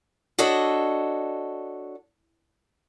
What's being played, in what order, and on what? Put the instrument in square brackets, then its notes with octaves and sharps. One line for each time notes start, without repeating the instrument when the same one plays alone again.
[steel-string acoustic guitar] D4 F#4 A4 C#5 D#5